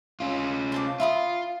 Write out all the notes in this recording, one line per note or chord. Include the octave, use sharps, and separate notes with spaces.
C#4 F4
C5 A5 D6
F4 E5 B5 D#6